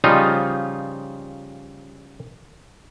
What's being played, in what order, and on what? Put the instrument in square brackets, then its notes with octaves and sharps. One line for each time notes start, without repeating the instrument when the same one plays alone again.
[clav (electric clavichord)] C#3 F3 G3 D#4 F4